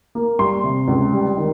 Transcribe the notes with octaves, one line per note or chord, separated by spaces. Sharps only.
A#3
G3 C6
C3
C#2
G3
D#3